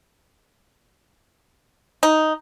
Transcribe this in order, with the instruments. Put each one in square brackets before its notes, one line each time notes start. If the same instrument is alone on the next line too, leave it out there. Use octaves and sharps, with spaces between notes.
[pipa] D#4